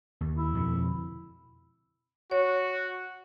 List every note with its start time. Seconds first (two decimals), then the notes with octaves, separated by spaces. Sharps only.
0.21 D#2
0.36 E4
0.54 F2 B2 D3
2.31 F#4 C#5